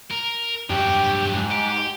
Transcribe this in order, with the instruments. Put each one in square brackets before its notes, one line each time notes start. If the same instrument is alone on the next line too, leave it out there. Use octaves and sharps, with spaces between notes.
[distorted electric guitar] A#4
[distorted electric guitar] G2 F#3 [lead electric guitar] G4
[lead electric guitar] G#2
[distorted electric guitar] G4